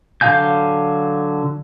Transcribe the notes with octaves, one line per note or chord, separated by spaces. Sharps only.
D3 F#3 F5 G#5 G6